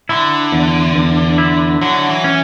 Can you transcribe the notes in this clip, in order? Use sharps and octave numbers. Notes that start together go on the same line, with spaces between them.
D3 E4
E2
E2
E4
D3 F#3
E3
C#4